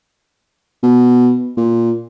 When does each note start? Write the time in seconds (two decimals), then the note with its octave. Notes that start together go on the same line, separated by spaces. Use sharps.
0.83 B2
1.57 A#2